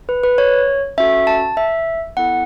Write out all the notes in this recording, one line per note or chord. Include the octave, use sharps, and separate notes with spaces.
B4
B4
C#5
C#4 F#4 A4 E5
A5
E5
B3 E4 A4 F#5